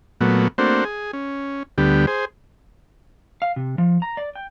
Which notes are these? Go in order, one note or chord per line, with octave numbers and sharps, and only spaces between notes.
A#2 F#3 A3 B3
A3 A#3 C4 D4 F#4 C5
G#4
C#4
D2 D3 G3 B3 G4
G#4 C5
F5
C3
F3
A#5
D5
G5